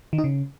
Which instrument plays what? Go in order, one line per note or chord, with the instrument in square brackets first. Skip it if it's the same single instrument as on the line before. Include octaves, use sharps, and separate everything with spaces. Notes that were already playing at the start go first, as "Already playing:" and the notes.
[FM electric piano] D#3
D#4
C#3